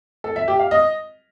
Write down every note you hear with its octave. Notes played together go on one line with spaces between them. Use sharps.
A4
E5
G4
F5
D#5